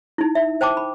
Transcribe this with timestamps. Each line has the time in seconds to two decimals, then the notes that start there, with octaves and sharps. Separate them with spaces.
0.18 D#4 E4
0.35 E5
0.61 C5 G5 A5 D6
0.77 B5